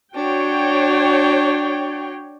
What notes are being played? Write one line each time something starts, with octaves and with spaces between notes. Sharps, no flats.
D4 F#4 C#5 G5